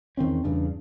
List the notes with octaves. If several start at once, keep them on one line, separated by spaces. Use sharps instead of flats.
E2 D#3 C4 C#4
E2 G2 C#3 D4